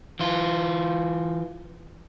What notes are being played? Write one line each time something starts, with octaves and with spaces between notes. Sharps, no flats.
E3 F4